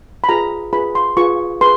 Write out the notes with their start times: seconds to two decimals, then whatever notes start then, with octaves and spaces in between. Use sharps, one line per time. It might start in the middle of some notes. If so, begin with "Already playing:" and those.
0.24 B5
0.29 F4 G#4 B4 A#5
0.73 F4 G#4 B4 B5
0.95 C6
1.17 F4 G#4 B4 C#6
1.61 G#4 B4 C6